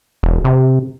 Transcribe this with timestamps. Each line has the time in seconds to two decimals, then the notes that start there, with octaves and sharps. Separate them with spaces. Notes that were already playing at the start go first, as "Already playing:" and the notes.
0.23 E1
0.44 C3